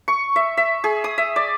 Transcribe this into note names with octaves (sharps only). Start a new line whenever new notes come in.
C#6
E5
E5
G#4
D#6
E5
D5